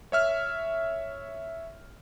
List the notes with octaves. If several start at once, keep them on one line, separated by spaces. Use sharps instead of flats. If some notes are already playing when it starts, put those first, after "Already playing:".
C#5 E5 F6